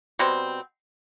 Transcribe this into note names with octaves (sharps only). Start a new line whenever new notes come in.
B2 G3 C4